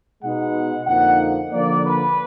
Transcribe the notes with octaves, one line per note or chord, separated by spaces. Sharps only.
B2 G#3 B3 D#4 F#5
F2 D3 F3 A#3 D#4 F#5
D3 F3 A#3 D5
B4